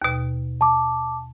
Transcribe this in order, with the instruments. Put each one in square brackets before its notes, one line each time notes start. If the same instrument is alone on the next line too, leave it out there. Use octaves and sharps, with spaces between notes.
[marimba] D#2 B2
[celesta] A5 D6